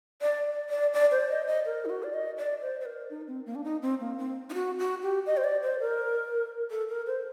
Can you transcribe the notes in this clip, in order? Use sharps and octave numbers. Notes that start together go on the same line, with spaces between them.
D5
D5
D5
C5
D#5
D#5
A#4
D#4
F#4
D5
D#5
D5
C5
C5
A#4
D#4
C4
A#3
D4
D#4
C4
A#3
C4
D#4
F#4
F#4
G4
D#5
C5
D5
C5
A#4
A4
A#4
C5